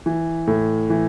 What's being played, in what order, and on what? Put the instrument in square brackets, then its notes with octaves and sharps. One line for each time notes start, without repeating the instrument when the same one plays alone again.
[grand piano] E3
A2
E3